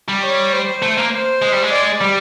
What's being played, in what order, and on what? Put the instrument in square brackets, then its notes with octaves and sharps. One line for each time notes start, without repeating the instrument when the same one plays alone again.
[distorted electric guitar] G3
[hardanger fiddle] C#5
C5
[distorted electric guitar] A3
A#3
[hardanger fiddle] C5
[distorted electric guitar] G#3
G3
G#3
[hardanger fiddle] D5
[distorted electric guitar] G3